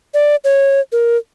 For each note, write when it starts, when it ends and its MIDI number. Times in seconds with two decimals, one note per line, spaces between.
0.14 0.36 74
0.44 0.80 73
0.92 1.17 70